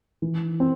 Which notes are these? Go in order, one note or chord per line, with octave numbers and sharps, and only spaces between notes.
E3
C4